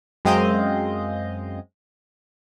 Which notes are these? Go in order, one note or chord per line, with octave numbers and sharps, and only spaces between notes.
F#2 G#3 C4 D#5 F5 G6